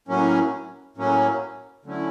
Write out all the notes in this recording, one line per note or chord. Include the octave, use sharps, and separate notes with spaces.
A2 F#3 A#3 C#4
A2 F#3 A#3 C#4
D3 F#3 A3 C#4 E4